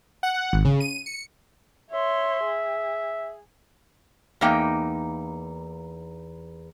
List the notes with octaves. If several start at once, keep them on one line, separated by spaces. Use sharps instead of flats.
F#5
F#5
G#1
C#3
D#7
C#7
C#5 E5 C6
G#4
E2 A#3 D#4 G5